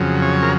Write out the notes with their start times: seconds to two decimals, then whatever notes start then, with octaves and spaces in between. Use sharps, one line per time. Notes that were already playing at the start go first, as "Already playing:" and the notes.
Already playing: F2 C#3 F#3
0.22 C#5
0.42 A#4